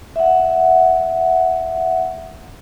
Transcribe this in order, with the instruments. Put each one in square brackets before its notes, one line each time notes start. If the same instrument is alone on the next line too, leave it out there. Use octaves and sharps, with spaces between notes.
[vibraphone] E5 F#5